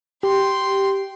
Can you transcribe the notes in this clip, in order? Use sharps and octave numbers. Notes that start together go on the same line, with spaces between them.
G4 G5 C6